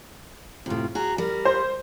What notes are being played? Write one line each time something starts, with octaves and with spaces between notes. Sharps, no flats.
A2 C3 F4
F#4 G#4 A#5
G3 A#4
C5